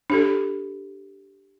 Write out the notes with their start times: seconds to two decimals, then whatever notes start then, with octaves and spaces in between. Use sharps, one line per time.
0.10 D4 G4 A4